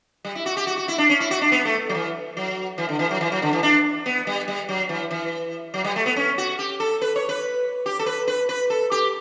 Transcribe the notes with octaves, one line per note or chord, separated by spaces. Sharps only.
G3
E4
F#4
G4
F#4
F#4
E4
D4
C#4
E4
F#4
D4
B3
A3
F#3
E3
F#3
E3
D3
E3
F#3
E3
F#3
D3
E3
D4
B3
G3
G3
F#3
E3
E3
F#3
G3
A3
B3
C#4
F#4
G4
A4
B4
C#5
B4
G4
A4
B4
B4
B4
A4
G4